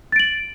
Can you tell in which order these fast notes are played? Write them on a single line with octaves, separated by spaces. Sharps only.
A6 D7 F#7